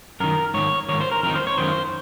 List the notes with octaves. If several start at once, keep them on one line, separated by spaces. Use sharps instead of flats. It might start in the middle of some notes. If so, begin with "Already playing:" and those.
F#2 D#3 A#4
G#2 D#3 C#5
G#2 D#3 C#5
C5
A#4
F2 D#3 A#4
C5
C#5
F#2 D#3 C5